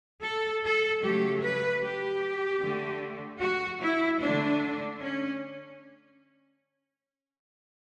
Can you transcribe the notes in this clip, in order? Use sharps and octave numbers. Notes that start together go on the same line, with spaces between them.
A4
A4
C#3 F#3 A3 G4
B4
G4
D3 A3
F#4
E4
D3 A3 D4
C#4